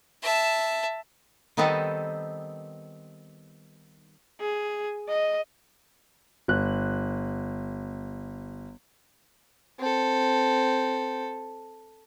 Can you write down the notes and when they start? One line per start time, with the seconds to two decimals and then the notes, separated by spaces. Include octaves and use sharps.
0.23 E5 A5
1.57 D#3 G3 B3 C4 D#4 A4
4.41 G#4
5.09 D#5
6.48 G1 F#6
9.79 C4 A4